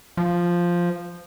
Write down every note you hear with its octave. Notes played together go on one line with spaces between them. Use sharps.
F3